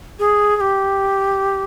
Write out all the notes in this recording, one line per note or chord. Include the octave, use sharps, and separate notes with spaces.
G#4
G#4
G4